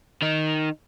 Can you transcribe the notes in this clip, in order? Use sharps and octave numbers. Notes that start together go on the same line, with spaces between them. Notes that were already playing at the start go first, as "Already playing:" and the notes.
D#3 D#4